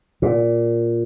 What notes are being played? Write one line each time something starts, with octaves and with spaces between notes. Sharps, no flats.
A#2